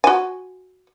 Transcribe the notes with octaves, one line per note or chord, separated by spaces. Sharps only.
F#4 G#5